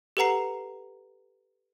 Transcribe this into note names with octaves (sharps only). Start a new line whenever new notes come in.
G4 A4 B4 F#5 A#5 C7